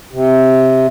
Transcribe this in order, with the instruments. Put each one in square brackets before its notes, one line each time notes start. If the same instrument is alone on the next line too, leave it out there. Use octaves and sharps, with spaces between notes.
[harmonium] C3